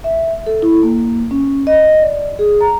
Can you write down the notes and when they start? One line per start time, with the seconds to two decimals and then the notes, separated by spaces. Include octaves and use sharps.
0.04 E5
0.46 A4
0.62 E4
0.83 A#3
1.31 C#4
1.67 D#5
2.01 D5
2.39 G#4
2.61 A#5